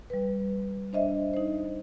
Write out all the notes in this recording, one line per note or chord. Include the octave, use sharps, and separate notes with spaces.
G3 B4
D4 C5 D#5 E5
D#4 C5